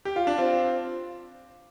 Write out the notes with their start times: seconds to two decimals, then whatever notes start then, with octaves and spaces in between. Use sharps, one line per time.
0.05 G4
0.16 F4
0.27 D4
0.38 C4 F4